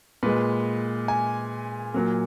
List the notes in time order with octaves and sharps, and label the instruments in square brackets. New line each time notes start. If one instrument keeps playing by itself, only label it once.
[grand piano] A#2 G#3 B4
G#5
A#2 F#3 A#3